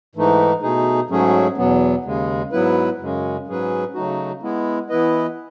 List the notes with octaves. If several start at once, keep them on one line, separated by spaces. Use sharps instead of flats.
G#2 E3 A3 D#4
B2 A3 D#4 G#4
G#2 F#3 A3 C#4 G#4
E2 B2 F#3 B3
D#2 C#3 G#3
G#2 F#3 B3 E4 B4
F#2 C#3 G#3 C#4
G#2 F#3 C#4 G#4 B4
C#3 F#3 A3 D#4 F#4
G#3 B3 E4
E3 B3 E4 B4 D#5